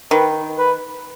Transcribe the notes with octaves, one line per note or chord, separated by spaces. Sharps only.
D#3 B4
B4